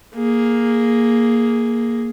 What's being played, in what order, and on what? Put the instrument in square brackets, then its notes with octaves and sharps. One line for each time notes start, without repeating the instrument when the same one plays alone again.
[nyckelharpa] A#3 G#4